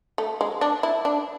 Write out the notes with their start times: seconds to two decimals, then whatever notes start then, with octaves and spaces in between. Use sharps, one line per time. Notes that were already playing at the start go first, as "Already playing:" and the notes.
0.18 A3
0.41 G#3
0.61 D4
0.83 E4
1.05 D4